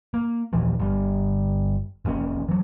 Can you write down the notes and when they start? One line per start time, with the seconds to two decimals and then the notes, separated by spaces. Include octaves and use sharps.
0.14 A#3
0.53 D#2 A#2 E3 F3
0.79 G1 G3
2.05 F1 E2 A#3 C#4
2.48 E3 F#3